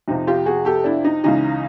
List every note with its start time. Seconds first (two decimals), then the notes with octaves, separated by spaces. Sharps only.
0.08 F2 C3 F3 D#4
0.27 F4 G4
0.46 F#4 G#4
0.65 G4 A4
0.84 D4 E4
1.05 D#4
1.23 C#2 C#3 E3 D#4